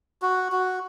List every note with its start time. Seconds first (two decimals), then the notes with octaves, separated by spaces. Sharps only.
0.22 F#4
0.52 F#4